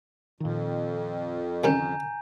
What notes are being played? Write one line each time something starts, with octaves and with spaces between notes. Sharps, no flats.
F2 A#2 D#3
C2 D3 D#3 C#4 G#5 A#5 G6